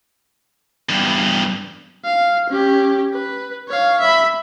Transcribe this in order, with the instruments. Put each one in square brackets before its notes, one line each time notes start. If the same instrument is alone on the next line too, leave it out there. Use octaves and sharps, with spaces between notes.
[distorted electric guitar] E2 G2
[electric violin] F5
C#4 G4
B4
C#5 F5
E5 B5